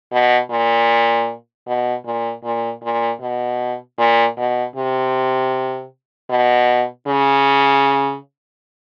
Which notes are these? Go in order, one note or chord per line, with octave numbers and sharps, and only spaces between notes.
B2
A#2
B2
A#2
A#2
A#2
B2
A#2
B2
C3
B2
C#3